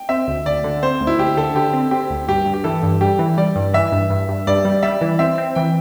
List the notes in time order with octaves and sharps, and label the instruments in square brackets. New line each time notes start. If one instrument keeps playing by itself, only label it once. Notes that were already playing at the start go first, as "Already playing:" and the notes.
Already playing: [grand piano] G5
[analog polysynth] C4 [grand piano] E5
[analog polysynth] D2
[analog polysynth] D2 [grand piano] D5
[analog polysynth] D3
[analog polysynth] C4 [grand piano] C5
[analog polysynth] D2
[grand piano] E4
[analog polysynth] D2 [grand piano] G4
[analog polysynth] D3 [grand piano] A4
[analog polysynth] D3 [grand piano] G4
[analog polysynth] C4
[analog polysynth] C4 [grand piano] G4
[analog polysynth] D2
[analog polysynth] G2 [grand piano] G4
[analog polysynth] G2
[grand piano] G4
[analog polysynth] E3 [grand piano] A4
[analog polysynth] G2
[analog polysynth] G3 [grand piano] G4
[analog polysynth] E3
[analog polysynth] G3 [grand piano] D5
[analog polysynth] G2
[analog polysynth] E3 [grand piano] E5
[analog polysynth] G2
G2
G2
[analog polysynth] G2 [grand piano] D5
[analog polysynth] G3
[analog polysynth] G3 [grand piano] E5
[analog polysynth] E3
[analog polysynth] C4 [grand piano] E5
[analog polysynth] C4
[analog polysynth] E3 [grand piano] G5